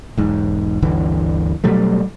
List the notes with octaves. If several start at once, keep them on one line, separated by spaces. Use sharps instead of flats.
E1 G#2
G1 D2 D3 E3
B2 F#3 G3 A3